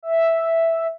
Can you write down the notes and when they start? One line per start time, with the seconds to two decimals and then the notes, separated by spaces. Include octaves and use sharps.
0.03 E5